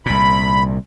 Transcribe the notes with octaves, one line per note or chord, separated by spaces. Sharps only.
C2 A#2 B5